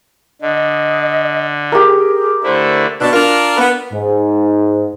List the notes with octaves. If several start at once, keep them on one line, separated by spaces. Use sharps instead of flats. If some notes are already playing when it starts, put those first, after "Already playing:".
D3 D#5
G4 G#4 A#4
D3 A3 E4 C5
B2 D4
D4 F4 A#4
B3
G#2